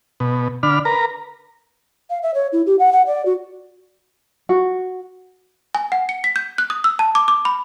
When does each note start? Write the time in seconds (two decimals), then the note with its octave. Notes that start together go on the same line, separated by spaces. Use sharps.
0.20 B2
0.63 D3 D4 B5 F6
0.85 A#4 B4 A#5
2.10 F5
2.22 E5
2.34 C#5
2.52 E4
2.66 G4
2.79 F#5
2.92 F#5
3.06 D5
3.25 F#4
4.49 F#4
5.75 G#5
5.92 F#5
6.09 C#7
6.24 B6
6.36 G6
6.58 F#6
6.70 D#6
6.84 E6
6.99 A5
7.15 D6
7.28 D6
7.45 B5